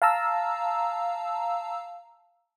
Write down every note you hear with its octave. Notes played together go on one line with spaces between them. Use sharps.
F5 A5 A#5 E6